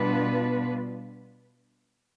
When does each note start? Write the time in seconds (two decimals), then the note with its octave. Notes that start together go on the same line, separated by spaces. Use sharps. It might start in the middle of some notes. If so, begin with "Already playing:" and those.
Already playing: B2 G3 B3 D4 F4 B4